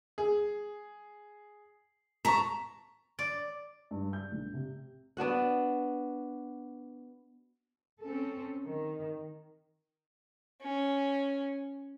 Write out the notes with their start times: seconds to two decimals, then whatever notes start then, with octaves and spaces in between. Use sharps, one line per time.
0.18 G#4
2.25 A5 A#5 C#6 B6
3.19 D5
3.91 G2
4.13 G6
4.32 A#1
4.54 C3
5.17 B3 D4 F#4 F#5
8.01 C4 C#4 A4
8.66 D#3
10.62 C#4